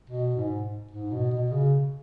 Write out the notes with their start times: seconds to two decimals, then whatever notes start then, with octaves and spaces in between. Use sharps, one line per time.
0.10 B2
0.37 G#2
0.91 G#2
1.12 B2
1.32 B2
1.52 C#3